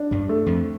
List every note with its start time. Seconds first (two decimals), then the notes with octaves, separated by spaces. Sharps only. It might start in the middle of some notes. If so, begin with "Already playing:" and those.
Already playing: D4
0.11 G2 G3
0.29 A3
0.46 F2 F3